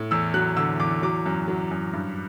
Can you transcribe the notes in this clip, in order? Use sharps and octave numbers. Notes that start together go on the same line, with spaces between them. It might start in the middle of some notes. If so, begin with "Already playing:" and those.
Already playing: A2
E2 E6
F#3 F#6
D3 E6
E2 D6
F#3 D6
F#2
F#3
F#2
G2